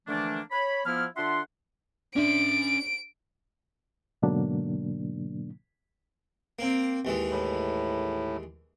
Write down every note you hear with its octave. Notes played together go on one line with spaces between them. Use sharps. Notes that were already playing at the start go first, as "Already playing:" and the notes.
D3 E3 F3 A3 A#3 D4
C#5 B5
F3 B3 E4 F6
D3 D4 F4 E5 F#5 C6
C#4 D4 E5 D7
G#2 B2 D3 F#3 A#3 D4
A#3 C4
D#2 E3 G#3
A2